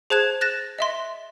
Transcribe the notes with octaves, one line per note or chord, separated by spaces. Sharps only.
G#4 C5 A5 F#6 G#6 E7
F#6 A6 A#6 E7
D#5 E5 C6